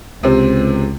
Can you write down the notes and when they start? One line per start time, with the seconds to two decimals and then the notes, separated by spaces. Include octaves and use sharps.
0.23 C#2 C3 C4